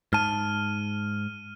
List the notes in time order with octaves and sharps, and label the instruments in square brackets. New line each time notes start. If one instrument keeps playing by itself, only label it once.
[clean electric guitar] G#2 A5 [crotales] F6 D#7